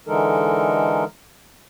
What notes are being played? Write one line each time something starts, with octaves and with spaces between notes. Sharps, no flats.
D3 E3 G#3 D#4 A4 A#4